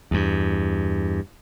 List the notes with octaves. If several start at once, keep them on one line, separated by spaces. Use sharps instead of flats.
E2 G2